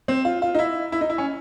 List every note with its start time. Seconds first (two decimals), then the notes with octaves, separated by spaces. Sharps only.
0.08 C4
0.25 F4
0.42 F4
0.55 D#4
0.59 E4
0.92 E4
1.01 D#4
1.10 E4
1.18 C#4